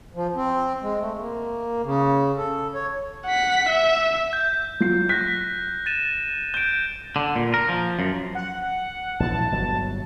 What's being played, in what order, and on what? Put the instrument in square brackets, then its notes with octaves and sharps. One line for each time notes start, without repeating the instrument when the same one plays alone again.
[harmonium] F3
C4
G#3
A3
A#3
C#3
A4
C#5
[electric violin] F#5 B6
E5
[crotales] G6
[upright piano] F#3 F4 C7
[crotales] F#6 A#6 [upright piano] B6
[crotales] A6 D#7 E7
[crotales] G6 D7 [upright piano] G7
[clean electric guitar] D3
A#2
A#4
F3
F#2
[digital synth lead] F#5
[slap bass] A#1 E3 [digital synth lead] A5
[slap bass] G1 F#3